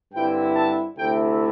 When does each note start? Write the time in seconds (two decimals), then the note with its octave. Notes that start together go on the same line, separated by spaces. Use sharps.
0.13 G2 D3 C4 E4 G5
0.55 A5
0.97 D2 C3 A3 E4 G5